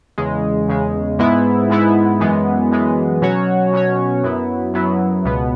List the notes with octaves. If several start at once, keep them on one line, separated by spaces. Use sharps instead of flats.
E2 C#3 G#3
E2 C#3 G#3
G#2 G#3 B3 E4
G#2 G#3 B3 E4
F#2 E3 G#3 B3
F#2 E3 G#3 B3
B2 F#3 C#4 F#4 C#5
B2 F#3 C#4 F#4 C#5
F#2 F#3 B3 E4
F#2 F#3 B3 E4
C#2 B2 B3